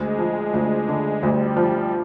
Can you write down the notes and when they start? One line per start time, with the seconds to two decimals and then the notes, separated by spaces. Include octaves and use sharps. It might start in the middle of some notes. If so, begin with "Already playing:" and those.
Already playing: D2 G#3
0.18 F3
0.54 D2
0.88 D3
1.22 D2 G3
1.57 F3